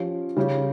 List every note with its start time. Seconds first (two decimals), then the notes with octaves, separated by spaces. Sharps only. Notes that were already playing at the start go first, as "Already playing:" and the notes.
Already playing: F3 C#4 G4
0.36 C#3 G3 C#4 G4